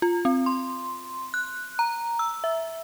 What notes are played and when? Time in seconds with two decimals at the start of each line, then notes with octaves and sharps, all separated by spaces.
0.02 F4
0.25 C4
0.46 C6
1.34 F#6
1.79 A#5
2.19 E6
2.44 E5